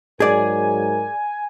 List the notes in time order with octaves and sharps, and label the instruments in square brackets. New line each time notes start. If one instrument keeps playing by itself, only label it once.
[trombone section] G#2 F#3 A#4 [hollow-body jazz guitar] G#4 D5 [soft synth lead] G#5